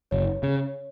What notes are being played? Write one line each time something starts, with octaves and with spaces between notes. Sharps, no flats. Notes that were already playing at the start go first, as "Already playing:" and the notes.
F#1 C#5
C#3